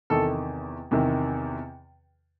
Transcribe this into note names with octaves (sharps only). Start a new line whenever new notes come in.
E2 C3 D#3 A4
E2 C3 D#3